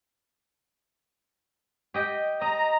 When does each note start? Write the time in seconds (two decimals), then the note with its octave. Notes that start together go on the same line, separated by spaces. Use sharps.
1.94 G4 D#5 G5
2.41 D#5 A#5